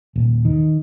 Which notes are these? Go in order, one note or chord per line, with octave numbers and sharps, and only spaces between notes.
D#1
D#3